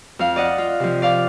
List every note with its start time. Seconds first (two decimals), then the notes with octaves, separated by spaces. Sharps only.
0.19 F2 F5
0.36 D5 D#5 F#5
0.58 F4
0.80 C3 F3
1.02 D5 F5 D6